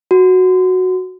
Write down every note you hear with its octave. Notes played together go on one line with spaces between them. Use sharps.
F#4